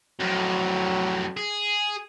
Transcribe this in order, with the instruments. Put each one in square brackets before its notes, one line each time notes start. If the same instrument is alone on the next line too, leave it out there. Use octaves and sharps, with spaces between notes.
[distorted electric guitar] F2 A2 [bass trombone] F#3
[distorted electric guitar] G#4